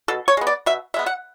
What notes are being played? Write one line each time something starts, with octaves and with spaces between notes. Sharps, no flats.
B2 A4
C#5
G#3 B3
D5
B2 E5
G#3 B3 E5
F#5